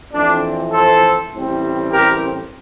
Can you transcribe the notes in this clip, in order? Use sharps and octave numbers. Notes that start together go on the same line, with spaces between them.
F2 E3 A3 C4 D4
A4 C5
A1 A2 G3 C4
G4 A#4